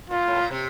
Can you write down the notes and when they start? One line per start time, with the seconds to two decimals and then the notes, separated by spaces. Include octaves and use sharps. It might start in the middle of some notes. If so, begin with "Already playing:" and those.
0.10 A#2 F4
0.27 A2
0.36 A#2
0.51 C3